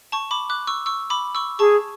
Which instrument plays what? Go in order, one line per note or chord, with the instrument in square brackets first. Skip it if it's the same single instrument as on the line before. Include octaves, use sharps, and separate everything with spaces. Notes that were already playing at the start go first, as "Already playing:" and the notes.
[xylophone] A5 C#6
B5 D6
D6 F#6
C#6 E6
C#6 E6
B5 D6
C#6 E6
[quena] G#4 [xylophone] A5 C#6